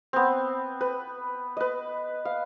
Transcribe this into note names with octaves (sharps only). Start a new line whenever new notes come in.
B3 C4
B4
B4 D#5
F5